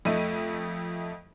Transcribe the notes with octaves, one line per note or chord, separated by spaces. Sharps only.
F2 A3 D#5 E5 D#7